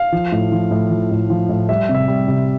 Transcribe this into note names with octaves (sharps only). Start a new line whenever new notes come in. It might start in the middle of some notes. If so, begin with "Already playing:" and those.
Already playing: F5
F3
A2
F3
A2
F3
A2
F3
A2
G3 E5
C3
E5
G3
C3